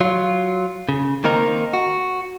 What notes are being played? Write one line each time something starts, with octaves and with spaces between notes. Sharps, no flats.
F#3 F4
C#3
D#3 A#3 C4 D#4 A#4
F#4